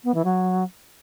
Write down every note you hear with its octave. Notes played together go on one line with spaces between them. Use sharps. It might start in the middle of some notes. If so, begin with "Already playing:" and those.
B3
E3
F#3